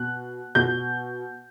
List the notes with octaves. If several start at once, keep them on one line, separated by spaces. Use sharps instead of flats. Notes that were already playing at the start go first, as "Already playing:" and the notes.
Already playing: B2 F#6
B2 G6